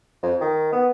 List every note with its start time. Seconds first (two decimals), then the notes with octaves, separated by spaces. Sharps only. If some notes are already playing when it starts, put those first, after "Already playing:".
0.23 F2
0.41 D#3
0.72 B3